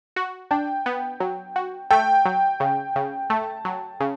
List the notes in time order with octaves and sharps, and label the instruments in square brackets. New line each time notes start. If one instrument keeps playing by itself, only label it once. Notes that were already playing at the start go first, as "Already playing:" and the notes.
[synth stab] F#4
[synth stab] D4 [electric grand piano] G5
[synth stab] B3
F#3
F#4
[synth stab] A3 [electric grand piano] G5
[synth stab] F#3
C#3
C#3
[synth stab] A3 [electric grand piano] A5
[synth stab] F#3
C#3